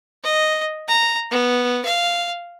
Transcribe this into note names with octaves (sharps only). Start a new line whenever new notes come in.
D#5
A#5
B3
F5